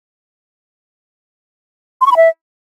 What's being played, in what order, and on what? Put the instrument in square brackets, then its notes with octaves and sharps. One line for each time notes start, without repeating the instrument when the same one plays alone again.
[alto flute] C6
C#6
B5
E5